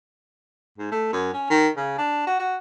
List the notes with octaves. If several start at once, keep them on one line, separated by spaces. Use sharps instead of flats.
G#2
A3
F#2
C#4
D#3
C#3
D4
F#4
F#4